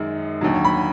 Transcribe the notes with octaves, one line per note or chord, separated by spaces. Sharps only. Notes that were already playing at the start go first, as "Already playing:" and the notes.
Already playing: F#2 D#3 G#3
D#2 D3 F#3
B5